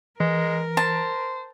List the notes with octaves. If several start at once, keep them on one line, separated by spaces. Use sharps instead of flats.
E3 G#3 A#4
C5 A5